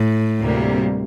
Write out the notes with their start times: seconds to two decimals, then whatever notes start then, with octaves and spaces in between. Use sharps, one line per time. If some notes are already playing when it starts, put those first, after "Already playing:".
Already playing: A2
0.40 D2 C3 G3 A#3